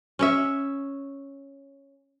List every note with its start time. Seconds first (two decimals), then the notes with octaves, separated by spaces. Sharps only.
0.19 C#4 C#5 E5